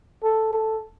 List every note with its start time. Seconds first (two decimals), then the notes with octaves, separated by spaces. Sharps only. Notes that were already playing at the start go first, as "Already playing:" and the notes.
0.23 A4
0.53 A4